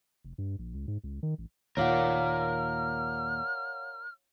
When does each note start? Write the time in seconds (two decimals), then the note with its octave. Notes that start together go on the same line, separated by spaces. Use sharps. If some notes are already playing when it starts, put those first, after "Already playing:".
0.24 F1
0.38 G2
0.59 A#1
0.74 C#2
0.88 G#2
1.04 C#2
1.23 D#3
1.38 A1
1.77 D#2 A#2 A#4 C#5 D5 F5 F#5 F6